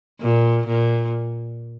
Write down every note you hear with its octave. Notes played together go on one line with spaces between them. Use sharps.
A#2
A#2